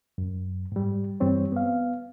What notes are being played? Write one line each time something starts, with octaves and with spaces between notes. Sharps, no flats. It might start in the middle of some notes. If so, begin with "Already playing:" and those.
F#2
G#2 G3
G2 E3 G3 C4 C#5
B3 F5